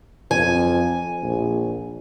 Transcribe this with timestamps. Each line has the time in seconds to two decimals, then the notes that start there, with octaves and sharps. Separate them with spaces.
0.31 F2 G#5
1.23 A#1